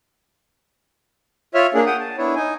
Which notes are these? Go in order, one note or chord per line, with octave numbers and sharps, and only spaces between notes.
F4 C#5 E5 F6
A#3 D4 G#4
F#5 G5 D#6
A5
B3 D4 E4 C#5
D#4 G#5